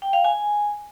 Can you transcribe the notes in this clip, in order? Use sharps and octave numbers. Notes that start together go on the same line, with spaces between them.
G5
F5
G#5